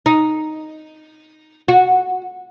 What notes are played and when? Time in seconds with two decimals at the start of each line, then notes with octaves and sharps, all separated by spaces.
0.06 D#4
1.68 F#4